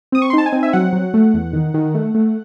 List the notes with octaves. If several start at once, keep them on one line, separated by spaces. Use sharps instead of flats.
C4 D#6
C#6
C6
D#4 A5
G#5
C4
E5
F#3 F#5
F#3
A3
E2
D#3
D#3
A3
A3